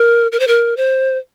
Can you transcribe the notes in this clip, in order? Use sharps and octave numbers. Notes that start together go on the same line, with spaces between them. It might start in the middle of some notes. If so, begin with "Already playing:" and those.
Already playing: A#4
A#4
C5
A#4
C5